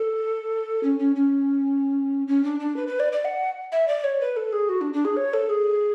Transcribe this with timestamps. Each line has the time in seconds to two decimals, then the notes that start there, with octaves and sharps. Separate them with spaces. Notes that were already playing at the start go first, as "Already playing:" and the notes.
Already playing: A4
0.83 C#4
0.99 C#4
1.16 C#4
2.28 C#4
2.44 D4
2.60 D4
2.76 B4
2.88 B4
3.00 D5
3.12 D5
3.25 F#5
3.72 E5
3.88 D5
4.04 C#5
4.21 B4
4.37 A4
4.53 G#4
4.69 F#4
4.81 D4
4.93 D4
5.05 G#4
5.17 C#5
5.34 A4
5.49 G#4